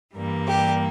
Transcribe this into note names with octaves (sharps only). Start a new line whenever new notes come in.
G2 E3 G3 A#3
G4